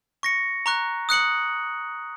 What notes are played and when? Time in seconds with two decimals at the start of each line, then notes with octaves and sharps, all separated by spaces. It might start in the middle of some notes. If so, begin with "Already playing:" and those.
0.23 C#6 A#6 C#7
0.66 A#5 C#6 F#6
1.09 D#6 F#6 C#7 F#7